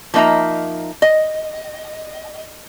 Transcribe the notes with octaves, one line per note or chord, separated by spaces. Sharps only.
F3 A#3 D#4 E5 A#5
D#5